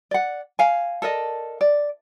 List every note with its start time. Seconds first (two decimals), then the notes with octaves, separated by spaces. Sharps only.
0.11 D5 F#5
0.59 F5 G#5
1.02 A4 A#4 D5 D#5
1.61 D5